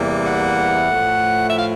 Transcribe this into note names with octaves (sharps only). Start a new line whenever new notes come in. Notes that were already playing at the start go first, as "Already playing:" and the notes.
Already playing: E2 C3 E3 G3 A#3
F#5
A2 F3 A3
E5
F5